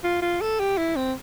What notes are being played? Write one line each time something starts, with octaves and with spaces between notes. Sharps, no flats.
F4
F4
A4
G4
E4
C4